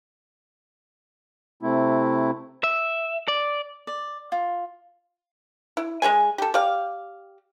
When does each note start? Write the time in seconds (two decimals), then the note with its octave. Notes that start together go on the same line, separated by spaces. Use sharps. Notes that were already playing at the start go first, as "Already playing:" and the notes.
1.63 C3 A3 C4 E4
2.64 E5
3.28 D5
3.87 D5
4.32 F4
5.77 E4
6.02 G#3 C#4 G#4 G#5
6.38 G4 A4
6.54 G4 D5 F5